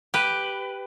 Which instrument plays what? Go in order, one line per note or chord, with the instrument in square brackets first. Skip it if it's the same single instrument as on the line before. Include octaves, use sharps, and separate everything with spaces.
[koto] G4 B4